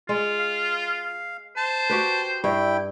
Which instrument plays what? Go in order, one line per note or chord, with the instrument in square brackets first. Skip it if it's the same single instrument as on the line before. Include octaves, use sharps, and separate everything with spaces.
[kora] G#3 [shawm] F4
[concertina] F5
[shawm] C5 [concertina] A5
[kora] F#4 G4 B4
[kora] G2 [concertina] E4 G5